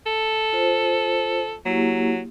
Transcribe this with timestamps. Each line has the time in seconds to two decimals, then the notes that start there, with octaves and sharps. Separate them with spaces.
0.06 A4
0.53 F4 C5
1.65 F#3 A#3 E4 G4